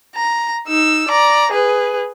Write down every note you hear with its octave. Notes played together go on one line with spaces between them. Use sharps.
A#5
D#4 E6
D5 A#5
G#4 B4